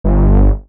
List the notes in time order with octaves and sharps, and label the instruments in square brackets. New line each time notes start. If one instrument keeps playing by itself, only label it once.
[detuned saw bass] G1